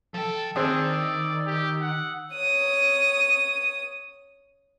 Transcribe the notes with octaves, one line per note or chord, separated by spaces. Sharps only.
F3 A4 G5
D#3 C4 D4 G#4 C5 D#6 E6
D5
G4
F#5
C#5 D#6